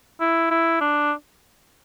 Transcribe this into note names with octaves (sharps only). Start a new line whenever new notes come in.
E4
E4
D4